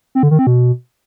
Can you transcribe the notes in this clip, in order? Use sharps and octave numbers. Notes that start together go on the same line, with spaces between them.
C4
D3
D#3
C4
B2